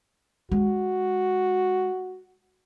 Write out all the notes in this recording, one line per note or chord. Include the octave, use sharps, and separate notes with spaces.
G#3 F#4